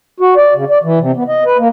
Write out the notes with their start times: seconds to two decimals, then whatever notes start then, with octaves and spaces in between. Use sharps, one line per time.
0.20 F#4
0.37 D5
0.55 C#3
0.70 D5
0.83 E3
0.99 C3
1.16 B3
1.28 D#5
1.45 B4
1.58 A#3